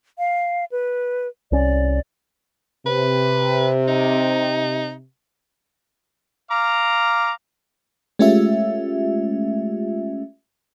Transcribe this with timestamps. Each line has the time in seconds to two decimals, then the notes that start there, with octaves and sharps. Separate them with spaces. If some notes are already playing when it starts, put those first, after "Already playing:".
0.19 F5
0.72 B4
1.52 C2 C#4 D5
2.86 C3 B4
3.88 D#4
6.51 F5 A#5 D6
8.19 G#3 A3 C#4 F4 G4 E5